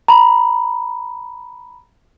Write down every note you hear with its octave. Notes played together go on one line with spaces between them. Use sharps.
A#5 B5